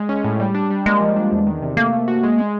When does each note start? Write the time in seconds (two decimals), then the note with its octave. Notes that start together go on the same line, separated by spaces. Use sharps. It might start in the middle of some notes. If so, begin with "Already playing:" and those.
Already playing: G#3
0.09 C#4
0.24 A2
0.40 G3
0.55 D4
0.70 G3
0.86 G#3 A#3
1.01 F3
1.16 D4
1.32 E2
1.47 D#3
1.62 C3
1.77 A3 A#3
1.93 A3
2.08 F#4
2.23 G#3
2.39 G#3